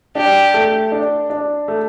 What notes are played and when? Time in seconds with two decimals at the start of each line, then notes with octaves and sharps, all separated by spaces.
0.15 D4 G4
0.54 A3
0.92 D4
1.30 D4
1.68 A3